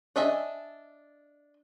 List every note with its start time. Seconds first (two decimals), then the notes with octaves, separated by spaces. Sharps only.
0.16 D4 D#5 E5 G#5